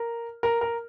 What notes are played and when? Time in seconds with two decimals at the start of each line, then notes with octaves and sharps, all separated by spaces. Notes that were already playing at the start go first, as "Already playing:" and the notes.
Already playing: A#4
0.43 A#4
0.61 A#4